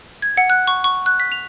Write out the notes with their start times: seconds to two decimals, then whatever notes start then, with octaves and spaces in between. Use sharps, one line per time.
0.22 G#6
0.37 F#5
0.50 F#6
0.67 C#6
0.84 C#6
1.06 F#6
1.20 B6
1.32 F7